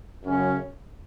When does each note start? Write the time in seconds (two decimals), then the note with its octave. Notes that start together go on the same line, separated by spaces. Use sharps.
0.24 F#2 C#3 F#3 C#4